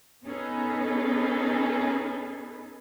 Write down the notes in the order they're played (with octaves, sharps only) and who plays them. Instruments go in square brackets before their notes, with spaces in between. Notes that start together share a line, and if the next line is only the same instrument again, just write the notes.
[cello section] B3 C#4 D#4 G#4 A4 B4